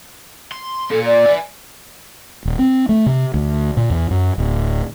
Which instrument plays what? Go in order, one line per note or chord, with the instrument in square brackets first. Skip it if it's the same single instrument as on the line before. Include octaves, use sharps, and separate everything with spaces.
[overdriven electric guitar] C6
[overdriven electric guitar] A#3 F4 [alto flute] A4
[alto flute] D5
[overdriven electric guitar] E5 G#5
[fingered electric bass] D#1
C4
A3
C3
D2
A#2
E2
F#2
D1